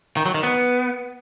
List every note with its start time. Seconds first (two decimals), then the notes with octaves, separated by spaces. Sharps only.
0.17 D#3
0.26 F#3
0.34 D#3
0.43 B3